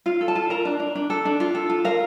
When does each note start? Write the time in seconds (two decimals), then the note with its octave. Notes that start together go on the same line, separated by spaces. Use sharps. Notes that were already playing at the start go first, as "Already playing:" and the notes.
0.06 F4 F5
0.21 A4
0.28 A5
0.36 F4
0.50 A#4 A#5
0.65 D4
0.80 D4
0.95 D4
1.10 A4
1.25 D4
1.40 F4
1.55 A4
1.70 F4
1.85 A#4 F5